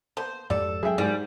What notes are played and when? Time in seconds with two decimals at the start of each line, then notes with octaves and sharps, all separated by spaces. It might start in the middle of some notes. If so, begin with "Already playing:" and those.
0.17 A#3 B3 C5 A5
0.50 F2 G#2 G3 A4 D5 F#5
0.83 F#3 G#3 A#3 C#4 G#4 E5 G5
0.98 G#2 G3 F#4 A#4 G#5